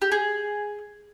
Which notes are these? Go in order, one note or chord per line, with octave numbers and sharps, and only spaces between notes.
G4
G#4